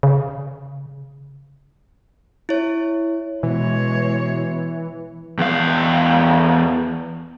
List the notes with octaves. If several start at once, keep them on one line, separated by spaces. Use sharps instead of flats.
C#3
E4 C#5
B2 E3 G#3 C#5
E2 F5